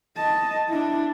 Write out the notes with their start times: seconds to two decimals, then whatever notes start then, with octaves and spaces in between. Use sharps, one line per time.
0.16 D#5 A5
0.68 D4 E4